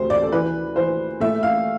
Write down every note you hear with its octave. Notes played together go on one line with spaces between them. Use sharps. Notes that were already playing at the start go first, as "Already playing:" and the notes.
Already playing: D2 C3 C5
D5
A4
E3 B4
E3 C5
A3 E5
F5